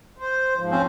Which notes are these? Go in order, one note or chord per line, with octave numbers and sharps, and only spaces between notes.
C5
G#2 F3
C4 C#4 C5